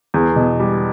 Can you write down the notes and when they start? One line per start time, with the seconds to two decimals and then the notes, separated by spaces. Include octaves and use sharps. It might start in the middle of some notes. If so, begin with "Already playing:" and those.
0.14 E2
0.36 B2
0.60 G3